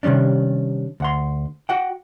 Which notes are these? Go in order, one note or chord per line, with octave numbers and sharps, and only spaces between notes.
C3 D#3 G3 C#4 D4
D2 F#5 C6
F#4 F#5 G5